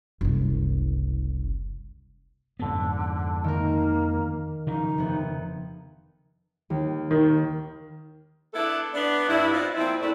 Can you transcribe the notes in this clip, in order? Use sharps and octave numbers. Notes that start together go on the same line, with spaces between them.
F#1 C2
F2 G#2 D3 B3
D#3 A#3 A#4
C#3 F3 D#4
F1 B3
D#2
D#3
B3 D4 E4 A4
B3 D4
G2 E4
B3 C4 D4 D#4 F4
A#2 F3 C4 E4
F#2 A3 D4 E4 D5